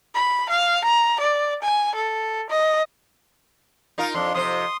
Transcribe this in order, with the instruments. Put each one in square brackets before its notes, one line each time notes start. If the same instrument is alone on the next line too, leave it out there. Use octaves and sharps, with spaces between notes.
[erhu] B5
F5
A#5
D5
G#5
A4
D#5
[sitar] D#4 F4 A#4
[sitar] F2 [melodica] D4 C6
[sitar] F2 C3 C5 [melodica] C6 D#6